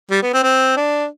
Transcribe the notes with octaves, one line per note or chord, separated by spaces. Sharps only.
G3
B3
C4
C4
D4